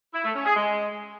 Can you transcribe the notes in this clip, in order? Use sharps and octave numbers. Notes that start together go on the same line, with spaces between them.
E4
A3
C#4
G#4
G#3